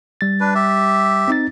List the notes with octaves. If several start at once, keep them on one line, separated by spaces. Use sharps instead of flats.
G3 A6
D4 B4
G4 E5
C4 D#4 A6